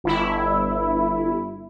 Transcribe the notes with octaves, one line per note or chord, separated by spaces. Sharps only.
G1 E4